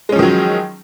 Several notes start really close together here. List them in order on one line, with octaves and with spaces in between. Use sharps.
G#3 C#4 F3 D#3 F#3